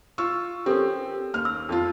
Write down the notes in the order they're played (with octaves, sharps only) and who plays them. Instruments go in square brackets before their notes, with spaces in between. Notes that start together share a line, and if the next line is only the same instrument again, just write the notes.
[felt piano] F4 C#6 E6
[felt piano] C4 C#4 [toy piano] G4 A4 A#4
[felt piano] D#2 F6
[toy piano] E6
[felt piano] F2 F3 F4